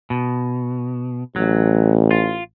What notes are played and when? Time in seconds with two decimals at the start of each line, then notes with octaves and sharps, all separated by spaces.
0.10 B2
1.36 A1 F#3
2.11 F4